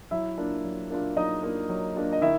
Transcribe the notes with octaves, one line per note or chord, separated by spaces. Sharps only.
F#3 E4 E5
A#3 D4 F4
F#3
A#3 D4 F4
F#3 D#4 D#5
A#3 D4 F4
F#3
A#3 D4 F4
D#5
D#3 E4 E5